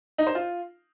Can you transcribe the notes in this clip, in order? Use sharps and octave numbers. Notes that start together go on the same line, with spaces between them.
D#4
C5
F4